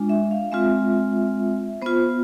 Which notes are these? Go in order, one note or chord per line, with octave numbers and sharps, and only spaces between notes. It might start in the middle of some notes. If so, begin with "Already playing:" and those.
Already playing: G#3 D4 F4
E5
F5
G#3 C4 F4 E5
B3 F4 C5